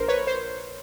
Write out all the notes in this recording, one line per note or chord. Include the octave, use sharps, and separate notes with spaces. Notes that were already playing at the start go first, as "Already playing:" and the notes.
Already playing: A#1 A#4 C5
B4 C#5
C5